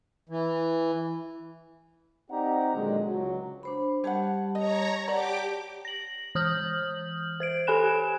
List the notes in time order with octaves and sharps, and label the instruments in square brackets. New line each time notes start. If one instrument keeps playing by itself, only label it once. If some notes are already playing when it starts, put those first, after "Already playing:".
[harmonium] E3
[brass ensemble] C4 D#4 G4 D5 F#5 A#5
A#2 D3 D#3 F#3 G#3
C#2 F#3
[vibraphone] D4 C5 B5
[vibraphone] G3 G4 A5 [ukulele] C#5 F#5
[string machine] C#5 A#5 [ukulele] D#5
[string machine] G4 D6 [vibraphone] C#5 F#5 A5 [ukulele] D5 A#5
[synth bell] A#6 F#7
E3 D#6 F6 G6 F#7
C5 G#6 D7
G4 A4 G#5 B5 F#6 E7